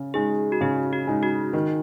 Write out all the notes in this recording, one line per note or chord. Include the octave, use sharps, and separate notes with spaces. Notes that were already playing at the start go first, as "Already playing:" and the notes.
Already playing: C#3
G#3 D#4 G#4
F#4
C#3 G#4
F#4
G#3 D#4
F#4
D#3